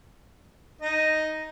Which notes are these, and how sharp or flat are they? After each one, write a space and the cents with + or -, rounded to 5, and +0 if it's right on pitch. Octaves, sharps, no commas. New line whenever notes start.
D#4 +0 D#5 +0